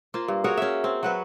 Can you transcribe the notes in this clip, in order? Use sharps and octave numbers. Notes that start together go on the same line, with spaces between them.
A#3 F4 C5
G2
F#4 G#4 A#4 C#5
C#4 E5
C4
F#3 F#4 B4